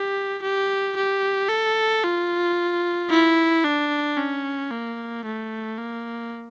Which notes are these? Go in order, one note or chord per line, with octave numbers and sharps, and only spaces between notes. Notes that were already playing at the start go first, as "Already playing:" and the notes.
Already playing: G4
G4
G4
A4
F4
E4
D4
C#4
A#3
A3
A#3